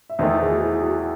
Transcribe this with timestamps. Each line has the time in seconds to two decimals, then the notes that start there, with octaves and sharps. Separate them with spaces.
0.10 E5
0.19 E2 D#3 A3 C5 D#5
0.39 G#4 C5
0.51 F#4
0.61 E4 G#4
0.82 F#4